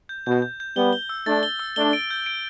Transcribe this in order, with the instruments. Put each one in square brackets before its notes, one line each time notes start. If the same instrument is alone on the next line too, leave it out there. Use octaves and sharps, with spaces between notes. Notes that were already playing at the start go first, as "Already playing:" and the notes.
[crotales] G6
[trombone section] B2 [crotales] G6
[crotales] G6
G6
[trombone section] G3 B3 [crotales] G7
[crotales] G7
E6
[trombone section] A3 D4 [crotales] A6
[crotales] G7
E6
[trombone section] A3 D4 [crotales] G7
[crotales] D7
G6
D7